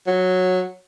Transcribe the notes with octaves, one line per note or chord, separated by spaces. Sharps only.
F#3